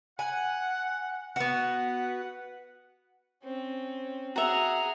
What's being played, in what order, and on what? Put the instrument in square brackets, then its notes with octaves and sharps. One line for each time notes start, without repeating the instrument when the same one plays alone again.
[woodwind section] F#5 [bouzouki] G#5
[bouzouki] B3 F#4 [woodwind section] B4 F#5
[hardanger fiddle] C4 C#4
[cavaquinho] F#4 E5 [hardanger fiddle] G#4 F#5 [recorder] A#5